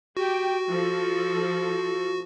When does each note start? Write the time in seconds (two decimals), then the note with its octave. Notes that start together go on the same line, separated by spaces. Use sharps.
0.17 F#4 G4 G5
0.67 F3 A4